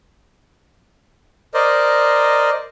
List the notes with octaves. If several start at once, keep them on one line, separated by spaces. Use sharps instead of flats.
A#4 C5 D5 D#5